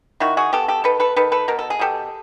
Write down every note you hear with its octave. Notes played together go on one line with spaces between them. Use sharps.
D#3 E4 F#4
F#4 G#4
B3 G4 A4
G4 A4
D#3 A4 B4
A4 B4
D#3 A4 B4
A4 B4
B2 A#4
A4
G#4
B2 G4 A4